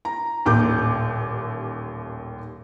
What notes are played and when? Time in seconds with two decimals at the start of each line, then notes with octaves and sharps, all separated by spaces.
0.05 A#5
0.45 D#1 A1 D#2 D6 G6